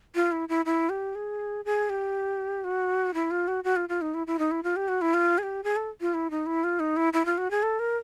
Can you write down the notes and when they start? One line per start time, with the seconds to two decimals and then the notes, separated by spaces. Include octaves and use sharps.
0.15 F4
0.32 E4
0.49 E4
0.66 E4
0.90 G4
1.15 G#4
1.65 G#4
1.90 G4
2.64 F#4
3.14 E4
3.31 F4
3.48 F#4
3.64 F#4
3.76 F4
3.89 F4
4.01 D#4
4.14 E4
4.27 E4
4.39 D#4
4.51 E4
4.63 F4
4.76 G4
4.88 F#4
5.02 E4
5.14 F4
5.38 G#4
5.43 G4
5.64 G#4
5.76 A4
6.01 F4
6.14 E4
6.31 D#4
6.46 E4
6.64 F4
6.80 D#4
6.97 E4
7.13 E4
7.25 F4
7.38 F#4
7.51 G#4
7.63 A4
7.79 A#4